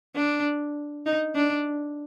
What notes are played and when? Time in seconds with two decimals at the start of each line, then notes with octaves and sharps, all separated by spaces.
0.16 D4
1.06 D#4
1.36 D4